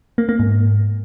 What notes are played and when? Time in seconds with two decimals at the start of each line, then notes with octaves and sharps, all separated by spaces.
0.18 A#3
0.29 A#3
0.39 G#2